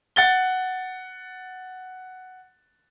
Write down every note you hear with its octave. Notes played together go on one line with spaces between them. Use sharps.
F#5 A6 G7